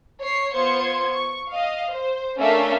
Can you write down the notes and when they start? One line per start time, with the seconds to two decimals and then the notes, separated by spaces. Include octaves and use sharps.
0.21 C#5 C7
0.54 B3 F4 C5 C6 G#6 C#7
1.14 C#6
1.51 D#5 F5
1.92 C5
2.39 A3 C#4 D4 A#4 E5 F5